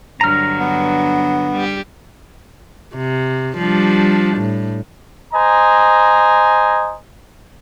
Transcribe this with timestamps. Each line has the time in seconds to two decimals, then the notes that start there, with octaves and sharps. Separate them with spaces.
0.21 G2 D3 F#3 A#5 F6
0.59 B3
1.52 G3 G4
2.95 C3
3.57 F3 G3 D4
4.37 A2
5.34 C5 D#5 G#5 A#5